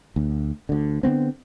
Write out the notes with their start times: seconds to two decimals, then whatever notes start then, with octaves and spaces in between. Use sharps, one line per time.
0.16 D2
0.69 D2 D3
1.03 D3 F#3 B3 C4